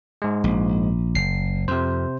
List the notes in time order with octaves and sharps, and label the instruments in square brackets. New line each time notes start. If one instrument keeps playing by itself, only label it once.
[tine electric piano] G#2 G#3
[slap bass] A#1
[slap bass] F#1 [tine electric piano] C7
[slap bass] F2 [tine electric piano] C3 C5